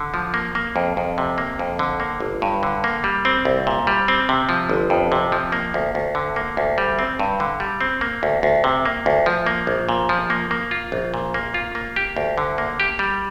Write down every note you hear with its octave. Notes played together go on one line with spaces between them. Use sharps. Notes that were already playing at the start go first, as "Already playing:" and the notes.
Already playing: D3
F3
A#3
A#3
F2
F2
C3
A#3
F2
D3
A#3
G1
G2
D3
A#3
G3
C4
C2
A#2
G3
C4
C3
F3
G1
F2
C3
F3
A#3
D2
D2
D3
A#3
D2
G3
C4
G2
D3
G3
C4
A#3
D2
D2
C3
A#3
D2
F3
A#3
A#1
A#2
F3
A#3
A#3
F4
A#1
A#2
A#3
F4
A#3
G4
D2
D3
A#3
G4
G3